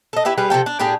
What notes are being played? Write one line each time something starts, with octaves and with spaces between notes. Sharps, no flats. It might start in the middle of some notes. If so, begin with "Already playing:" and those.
A4 D#5
E4 G4 B4 E5
G3 G4 G#4 B4
C3 F3 A4 G5
D4
A2 D4 G4 G#4